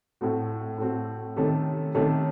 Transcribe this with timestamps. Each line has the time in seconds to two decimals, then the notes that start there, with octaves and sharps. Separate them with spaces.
0.21 A2 A3 C4 F#4
0.78 A2 A3 C4 F#4
1.36 C3 D#3 A3 C#4 A4
1.95 C3 D#3 A3 C#4 A4